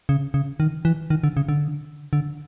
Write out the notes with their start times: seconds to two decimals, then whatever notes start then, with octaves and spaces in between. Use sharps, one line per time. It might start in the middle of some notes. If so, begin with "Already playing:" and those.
0.09 C#3
0.34 C#3
0.60 D#3
0.85 E3
1.10 D#3
1.24 D3
1.37 C#3
1.49 D3
2.13 D3